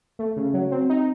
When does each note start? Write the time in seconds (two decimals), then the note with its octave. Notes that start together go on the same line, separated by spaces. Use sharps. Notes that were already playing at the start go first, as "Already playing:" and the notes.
0.19 A3
0.37 C#3
0.54 F#3
0.71 C4
0.90 D#4